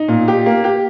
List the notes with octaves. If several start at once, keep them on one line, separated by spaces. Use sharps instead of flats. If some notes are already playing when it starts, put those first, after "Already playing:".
Already playing: D#4
A#2
G4
A#3
G4